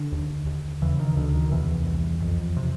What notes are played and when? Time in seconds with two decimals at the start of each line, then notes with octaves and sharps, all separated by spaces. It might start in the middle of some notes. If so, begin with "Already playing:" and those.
Already playing: D3
0.12 D#2
0.47 D#2
0.82 E2 C#3 E3
1.00 D#3
1.17 D2 D3
1.34 D#3
1.51 E2 C3 E3
1.86 C2
2.22 F2
2.57 C3